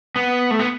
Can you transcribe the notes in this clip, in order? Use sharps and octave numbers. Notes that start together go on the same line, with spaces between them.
B3
A3
B3